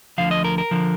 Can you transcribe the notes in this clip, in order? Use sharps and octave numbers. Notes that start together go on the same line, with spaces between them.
D2 D3 F3 F5
D#5
A#4
A#4
D3 F3